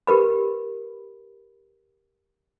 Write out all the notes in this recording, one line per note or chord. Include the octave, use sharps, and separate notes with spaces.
G4 A#4 B4 B5